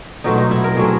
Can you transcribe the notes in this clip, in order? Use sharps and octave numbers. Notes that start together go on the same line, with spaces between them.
B2 F#3 A3 C4 D#4
D#4
E4
A#4
B2 F#3 A3 C4 G#4